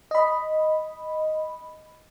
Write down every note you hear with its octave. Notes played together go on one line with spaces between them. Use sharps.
D#5 B5